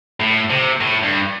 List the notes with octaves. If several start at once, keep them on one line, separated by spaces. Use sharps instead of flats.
A2
C3
A2
G2